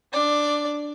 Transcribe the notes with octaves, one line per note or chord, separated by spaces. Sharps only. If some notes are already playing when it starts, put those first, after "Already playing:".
D4 D5